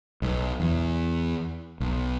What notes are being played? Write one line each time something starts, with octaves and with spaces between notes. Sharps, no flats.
B1
E2
B1